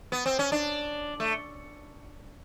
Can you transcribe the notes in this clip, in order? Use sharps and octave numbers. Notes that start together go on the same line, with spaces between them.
B3
C4
C#4
D4
A3